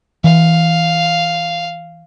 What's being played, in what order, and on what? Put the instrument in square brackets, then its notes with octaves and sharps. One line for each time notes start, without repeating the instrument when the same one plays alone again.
[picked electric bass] E3 [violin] F5